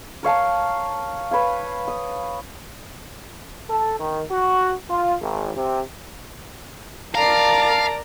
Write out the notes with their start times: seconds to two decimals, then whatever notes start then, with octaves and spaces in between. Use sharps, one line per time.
0.23 A#4 C#5 F5 A5
1.31 B4 C#5 F5
1.88 D#6
3.70 A4
4.00 D#3
4.30 F#4
4.89 F4
5.21 G#1
5.57 C3
7.15 A#4 D5 F5 A5 A#5